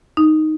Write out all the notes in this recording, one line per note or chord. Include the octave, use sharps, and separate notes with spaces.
D#4